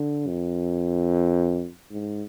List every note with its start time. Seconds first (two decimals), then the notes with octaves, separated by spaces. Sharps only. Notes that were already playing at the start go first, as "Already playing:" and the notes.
Already playing: D3
0.27 F2
1.91 G#2